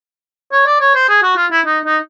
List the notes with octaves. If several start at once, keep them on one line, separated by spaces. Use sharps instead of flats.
C#5
D5
C#5
C5
G#4
F#4
F4
E4
D#4
D#4